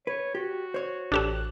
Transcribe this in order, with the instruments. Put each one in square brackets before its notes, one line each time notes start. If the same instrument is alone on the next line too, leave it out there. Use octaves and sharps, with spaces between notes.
[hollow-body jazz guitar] B4 [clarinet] C#5
[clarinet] F#4 [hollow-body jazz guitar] G4
[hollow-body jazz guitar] C5 C#5
[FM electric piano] A1 F#6 [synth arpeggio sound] D4 G4 A4